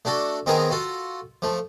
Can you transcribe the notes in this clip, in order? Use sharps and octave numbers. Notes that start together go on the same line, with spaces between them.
A3 D4 F#4 A4
D#3 B3 C4 D#4 G#4 A#4
F4 F#4 A4
F3 A3